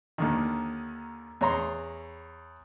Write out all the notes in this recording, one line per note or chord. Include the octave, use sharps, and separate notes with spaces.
D#2 D3 D#3
E2 C#5 A#5 C6